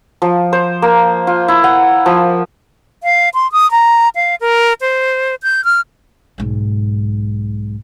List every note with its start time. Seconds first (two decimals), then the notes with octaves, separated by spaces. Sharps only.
0.22 F3
0.53 C5
0.82 A#3
1.27 F4
1.48 E4
1.64 F#5
2.06 F3
3.03 F5
3.34 C6
3.52 D#6
3.71 A#5
4.15 F5
4.41 A#4
4.81 C5
5.43 G6
5.65 F6
6.38 B1 G#2